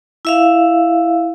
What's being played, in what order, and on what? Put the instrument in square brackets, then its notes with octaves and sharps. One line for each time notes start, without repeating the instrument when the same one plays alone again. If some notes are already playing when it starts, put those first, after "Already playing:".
[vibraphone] E4 E5 F5